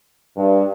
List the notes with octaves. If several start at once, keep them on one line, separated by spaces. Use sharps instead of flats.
G2